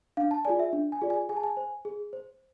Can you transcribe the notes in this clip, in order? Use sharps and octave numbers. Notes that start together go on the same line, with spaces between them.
D4 F5
A5
F4 G#4 D5 G#5
E5
D4
G#5
F4 G#4 D5
G#5
G#4 G#5
A5
G#5
C5
G#4
C5